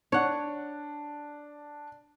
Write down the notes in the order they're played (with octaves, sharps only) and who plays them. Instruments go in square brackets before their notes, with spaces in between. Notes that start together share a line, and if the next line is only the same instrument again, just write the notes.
[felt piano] D4 [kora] C#5 F#5